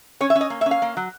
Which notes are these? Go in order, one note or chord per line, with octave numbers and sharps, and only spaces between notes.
C#4 C#5
E5
C#4
D#5
A#3
E5
C#4
F5
A#3
F#3